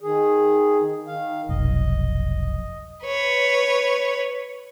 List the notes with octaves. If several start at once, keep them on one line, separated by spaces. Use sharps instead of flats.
D#3 G#4
D#3 F5
F1 B1 D#5
B4 C#5